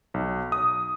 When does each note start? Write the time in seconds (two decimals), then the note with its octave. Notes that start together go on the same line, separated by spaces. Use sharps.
0.14 B1
0.52 D#6